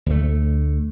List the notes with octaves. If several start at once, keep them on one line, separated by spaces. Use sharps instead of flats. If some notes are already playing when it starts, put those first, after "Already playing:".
D2 A3